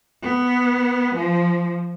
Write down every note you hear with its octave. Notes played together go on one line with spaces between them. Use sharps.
B3
F3